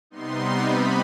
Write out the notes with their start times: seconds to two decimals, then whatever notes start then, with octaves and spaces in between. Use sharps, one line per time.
0.10 C3 G3 B3 D#4 C6
0.57 B5